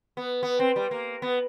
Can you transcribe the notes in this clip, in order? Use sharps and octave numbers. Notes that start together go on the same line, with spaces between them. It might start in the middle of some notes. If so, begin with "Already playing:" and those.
B3
B3
C4
G3
A#3
B3